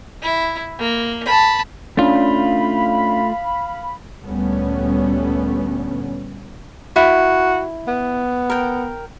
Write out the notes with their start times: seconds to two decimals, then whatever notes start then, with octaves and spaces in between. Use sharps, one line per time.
0.22 E4
0.79 A#3
1.25 A5 B5
1.97 A3 C#4 D4 F4 F5 B5
4.25 D2 A#2 G3 A3 B3 C#4
6.96 E4 F#4
7.88 B3
8.50 A#4 G5